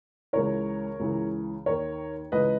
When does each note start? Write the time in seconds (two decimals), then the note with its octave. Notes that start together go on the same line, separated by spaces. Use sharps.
0.33 C#2 C#3 E3 A#4 C#5
1.00 C#2 C#3 E3
1.66 D#2 D#3 A#4 C#5
2.32 C#2 C#3 E3 B4 D#5